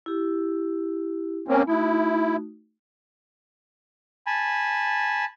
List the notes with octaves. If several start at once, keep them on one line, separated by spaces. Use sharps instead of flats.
E4 G4
A#3 C4 C#4
A3 D#4 E4 F#4
G#5 A5 B5